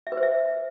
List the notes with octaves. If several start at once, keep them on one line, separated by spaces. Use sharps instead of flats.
E5
B4
C5
E5